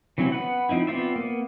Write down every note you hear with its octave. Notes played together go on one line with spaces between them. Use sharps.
E3 F#3 C4 C#4 E4
B3 B4 F#5
F3 C4 D#4 E4
B3 C4 F4 D5 E5
A#3 B3